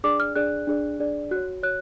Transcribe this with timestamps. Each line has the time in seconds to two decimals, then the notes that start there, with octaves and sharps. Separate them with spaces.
0.04 D4 G#4 D5 D6
0.20 F6
0.36 D4 G#4 D5 F#6
0.67 D4 G#4 D5
1.00 D4 G#4 D5
1.31 F#4 C#5 F#6
1.63 F#4 C#5 F#6